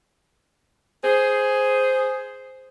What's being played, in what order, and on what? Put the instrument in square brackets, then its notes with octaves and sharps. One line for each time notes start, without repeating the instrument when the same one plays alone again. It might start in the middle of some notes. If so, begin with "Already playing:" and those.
[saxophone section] G#4 C5